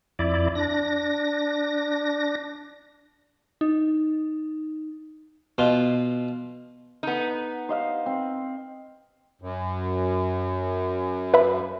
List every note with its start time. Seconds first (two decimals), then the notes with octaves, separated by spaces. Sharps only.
0.19 F2 E4 D5
0.55 D4 A#6
3.61 D#4
5.58 B2 F4
7.03 B3 D#4
7.69 C5 D#5 F5
8.06 C4
9.42 F#2
11.34 B4 E5 B5